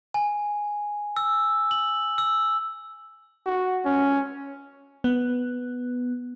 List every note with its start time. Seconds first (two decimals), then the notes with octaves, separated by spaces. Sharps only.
0.14 G#5
1.17 E6
1.71 F#7
2.18 E6
3.46 F#4
3.85 C#4
5.04 B3